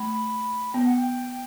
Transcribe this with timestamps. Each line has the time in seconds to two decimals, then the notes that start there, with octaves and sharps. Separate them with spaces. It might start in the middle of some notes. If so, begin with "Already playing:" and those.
Already playing: A3 B5
0.73 B3 G5
0.85 F#5
0.97 G5